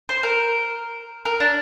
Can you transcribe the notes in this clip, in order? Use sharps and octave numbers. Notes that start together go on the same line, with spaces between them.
C5
A#4
A#4
D4